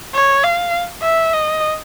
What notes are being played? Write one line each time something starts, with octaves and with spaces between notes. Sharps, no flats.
C#5
F5
E5
D#5